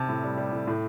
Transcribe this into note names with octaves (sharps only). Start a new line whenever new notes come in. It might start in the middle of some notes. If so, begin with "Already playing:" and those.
Already playing: C3 A5
A2
G3
G3
A2
A2